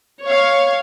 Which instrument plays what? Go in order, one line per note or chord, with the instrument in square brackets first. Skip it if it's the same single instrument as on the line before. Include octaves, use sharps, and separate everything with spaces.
[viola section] C#5 F5